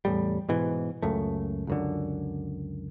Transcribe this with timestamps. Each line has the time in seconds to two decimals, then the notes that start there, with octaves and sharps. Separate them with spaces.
0.05 E2 A2 G3
0.49 G#2 B2 E3
1.02 C#2 F#2 A3
1.67 C#2 F#2 D3